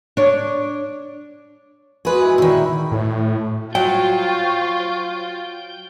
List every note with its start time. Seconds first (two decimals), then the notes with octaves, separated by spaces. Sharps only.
0.17 D4 C#5
2.05 G#3 F#4 G#4 B4
2.22 E3
2.38 A#2 D#3 E4 B4 C#5
2.92 A2
3.75 F#3 F4 C5 G5 C#6